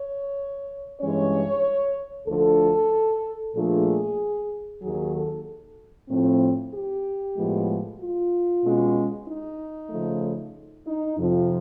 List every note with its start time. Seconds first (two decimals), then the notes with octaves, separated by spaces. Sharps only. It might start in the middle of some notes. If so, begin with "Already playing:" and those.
Already playing: C#5
1.00 G2 E3 G#3 C#4 C#5
2.27 D2 D3 F3 A4
3.54 A#2 F3 A3 D4 G#4
4.81 D#2 D#3 F#3 G#4
5.14 A4
6.09 A2 F3 A3 C4
6.73 G4
7.36 A2 F3 G#3 B3
8.00 F4
8.63 B2 G#3 C#4
9.27 D#4
9.90 C#3 F3 A3
10.86 D#4
11.18 F2 C3 F3